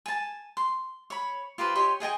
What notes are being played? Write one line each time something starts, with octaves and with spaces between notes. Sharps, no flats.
G#5 A5
C6
C#5 B5
F4 G4 B4 C5
G4 C#5 D#5 C6
G#4 D#5 G5 G#5